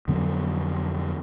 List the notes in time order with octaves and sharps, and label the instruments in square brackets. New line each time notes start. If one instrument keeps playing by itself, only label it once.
[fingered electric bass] F2 D3 F#3 B3